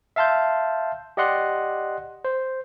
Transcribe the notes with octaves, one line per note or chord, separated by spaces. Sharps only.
E5 F5 A5 C6 G6
G4 D5 D#5 F#5 C6 F#6
C5